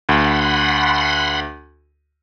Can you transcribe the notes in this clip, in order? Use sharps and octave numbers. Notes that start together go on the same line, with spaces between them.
D2 F#5 B5 C6